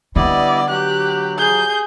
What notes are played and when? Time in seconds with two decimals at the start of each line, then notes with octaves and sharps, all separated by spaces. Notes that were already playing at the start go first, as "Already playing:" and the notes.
0.16 D3 G3 B3 E4 D5 D#5
0.70 F#3 G4 F#6
1.38 G#4 G6